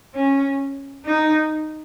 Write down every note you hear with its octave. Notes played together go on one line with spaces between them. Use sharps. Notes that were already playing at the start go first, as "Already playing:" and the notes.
C#4
D#4